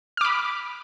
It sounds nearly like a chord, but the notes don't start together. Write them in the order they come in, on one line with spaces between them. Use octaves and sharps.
F6 D6 B5